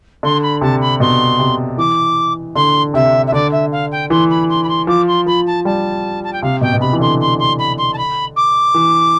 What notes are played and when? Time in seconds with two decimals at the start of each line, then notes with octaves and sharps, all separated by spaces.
0.23 D3 C6
0.42 B5
0.61 C3 A5
0.81 B5
1.00 B2 C6
1.39 C3
1.78 E3 D6
2.55 D3 C6
2.94 C3 E5
3.27 E5
3.32 D3 D5
3.52 E5
3.72 F5
3.91 G5
4.10 E3 C6
4.30 B5
4.49 C6
4.63 B5
4.68 C6
4.87 F3 D6
5.07 C6
5.26 F3 B5
5.46 A5
5.65 G3 A5
6.23 A5
6.32 G5
6.42 C3 F5
6.61 B2 G5
6.73 B2
6.81 C3 B5
6.93 E3
7.00 D3 C6
7.20 C6
7.39 C6
7.58 B5
7.77 C6
7.93 A5
7.97 B5
8.36 D6
8.75 E3